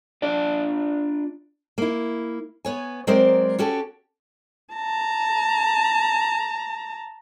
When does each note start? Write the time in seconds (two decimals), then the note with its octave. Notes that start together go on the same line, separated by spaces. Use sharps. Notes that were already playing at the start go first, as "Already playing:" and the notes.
0.22 D4 F4 D5
1.78 A#3 E4
2.65 B3 C#5 G#5
3.07 F#3 G#3 C4 A#4 C5 D5
3.59 C#4 F#4 G4 A4
4.74 A5 A#5